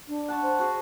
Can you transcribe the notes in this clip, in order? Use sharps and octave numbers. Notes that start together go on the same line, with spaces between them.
D4
F#5 A5 C#6
C5
F#4 G#4